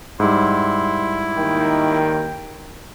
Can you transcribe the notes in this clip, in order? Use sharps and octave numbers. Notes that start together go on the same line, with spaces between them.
G#2 G3 E4 C6
D#2 D#3 G5